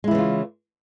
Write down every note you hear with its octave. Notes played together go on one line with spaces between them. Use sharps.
C#3 E3 G#3 E4 F4